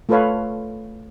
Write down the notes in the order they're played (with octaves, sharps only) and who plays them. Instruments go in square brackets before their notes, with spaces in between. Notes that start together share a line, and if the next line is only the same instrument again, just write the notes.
[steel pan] A3 F4 A4 B4 C#5 F5